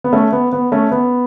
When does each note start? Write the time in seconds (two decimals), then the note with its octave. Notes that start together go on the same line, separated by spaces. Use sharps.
0.04 B3
0.13 A3 C#4
0.33 B3
0.53 B3
0.72 A3 C#4
0.91 B3